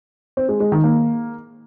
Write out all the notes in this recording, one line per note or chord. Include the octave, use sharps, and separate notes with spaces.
C4
G#3
G#3
D#3
A#3